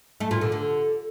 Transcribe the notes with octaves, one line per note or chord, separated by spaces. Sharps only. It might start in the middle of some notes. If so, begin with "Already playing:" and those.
A3
A#2
D3
D3